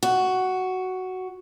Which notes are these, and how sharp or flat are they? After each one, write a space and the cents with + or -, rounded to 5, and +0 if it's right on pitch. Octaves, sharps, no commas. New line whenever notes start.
F#4 +5